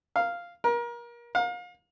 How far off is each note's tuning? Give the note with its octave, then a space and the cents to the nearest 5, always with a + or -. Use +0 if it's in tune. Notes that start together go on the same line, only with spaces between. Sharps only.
F5 -5
A#4 +30
F5 +35